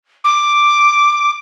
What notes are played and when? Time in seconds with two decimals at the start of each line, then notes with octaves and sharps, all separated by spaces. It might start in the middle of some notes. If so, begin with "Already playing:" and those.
0.24 D6